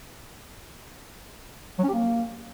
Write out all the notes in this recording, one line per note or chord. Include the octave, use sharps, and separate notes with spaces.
F#3
C#4
G4
A#3